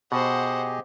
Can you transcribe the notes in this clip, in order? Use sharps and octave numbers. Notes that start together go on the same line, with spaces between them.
B2 G4 G#4 C5 D#5 F#5